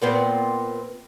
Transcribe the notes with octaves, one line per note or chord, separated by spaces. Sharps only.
A#2 B3 C4